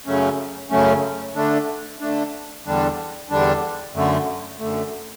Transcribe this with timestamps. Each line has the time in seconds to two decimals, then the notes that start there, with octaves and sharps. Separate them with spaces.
0.06 F#2 C#3 F#3 A3 C#4
0.70 F#2 C#3 F#3 A3 C#4
1.35 D3 A3 D4
2.01 D3 A3 D4
2.66 E2 D3 G3 D4
3.30 E2 D3 G3 D4
3.94 F#2 D3 A3
4.59 F#2 D3 A3